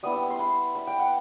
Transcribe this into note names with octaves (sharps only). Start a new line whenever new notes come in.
G3 B3 E4 D#6
E6
C6
B5
B5
G5
F#5